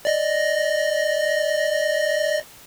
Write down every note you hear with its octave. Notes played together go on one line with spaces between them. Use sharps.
D5 D#5 A#6